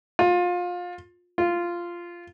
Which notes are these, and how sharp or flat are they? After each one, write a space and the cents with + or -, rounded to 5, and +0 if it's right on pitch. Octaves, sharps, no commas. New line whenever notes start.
F4 +25
F4 -10